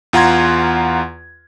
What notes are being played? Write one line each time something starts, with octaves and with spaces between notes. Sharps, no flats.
E2 F4 F#5 A#5 C6 G#6